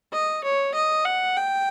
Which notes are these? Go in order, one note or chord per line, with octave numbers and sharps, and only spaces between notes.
D#5
C#5
D#5
F#5
G5